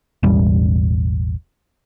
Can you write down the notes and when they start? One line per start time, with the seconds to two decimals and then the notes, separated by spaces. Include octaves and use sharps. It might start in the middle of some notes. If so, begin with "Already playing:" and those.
0.23 E1 A1 G3